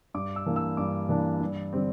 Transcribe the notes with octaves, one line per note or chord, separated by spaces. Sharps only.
G2 D6
E6
E3 A#3 D4
E6
G2 D6
E3 A#3 D4
G2
D3 G3 C4